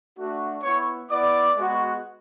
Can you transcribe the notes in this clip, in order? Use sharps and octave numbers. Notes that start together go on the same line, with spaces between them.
A3 D4 F#4
B3 E4 C#5 C#6
B3 E4 D5 D6
G#3 B3 F#4